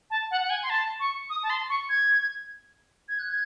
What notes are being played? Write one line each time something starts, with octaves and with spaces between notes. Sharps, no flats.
A5
F#5
F#5
G#5
C6
A5
C#6
D#6
A5
C6
C#6
G#6
G#6
F#6
G#6